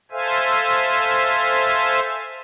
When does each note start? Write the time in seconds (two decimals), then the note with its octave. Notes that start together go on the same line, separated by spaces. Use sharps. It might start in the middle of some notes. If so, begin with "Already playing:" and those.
0.12 A4 C5 E5 F5 G#5